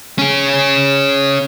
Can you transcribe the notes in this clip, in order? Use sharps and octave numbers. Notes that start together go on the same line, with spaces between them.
C#4 G#4